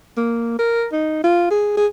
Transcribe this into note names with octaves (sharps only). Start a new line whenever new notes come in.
A#3
A#4
D#4
F4
G#4
G#4